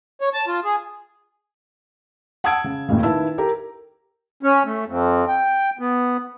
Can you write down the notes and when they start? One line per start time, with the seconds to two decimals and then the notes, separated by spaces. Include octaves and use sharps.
0.21 C#5
0.33 A5
0.47 F4
0.64 G#4
2.44 F#5 A5 D#6 E6 G#6 D7
2.64 C#3
2.89 A1 D#2 A#2 C#3
3.03 D#3 E4 B4 A5 E6
3.38 G4 A#4 A#5
4.43 C#4
4.65 A3
4.86 F2
5.28 G5
5.79 B3